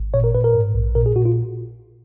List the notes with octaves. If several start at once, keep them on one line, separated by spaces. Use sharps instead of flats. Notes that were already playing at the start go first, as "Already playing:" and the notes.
Already playing: G#1
A#2 C#5
A#4
A#2 B4
A#4
G#2
A#1
A#2 A#4
G#4
A#2 F#4
F4